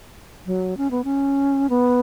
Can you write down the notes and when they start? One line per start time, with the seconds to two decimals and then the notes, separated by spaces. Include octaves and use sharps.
0.46 F#3
0.77 C#4
0.91 B3
1.04 C#4
1.70 B3